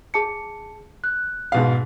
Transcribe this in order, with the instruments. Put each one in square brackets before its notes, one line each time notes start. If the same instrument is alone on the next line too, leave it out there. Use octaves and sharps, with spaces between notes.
[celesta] G#4 A5 C#7
F#6
[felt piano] G#2 B2 F5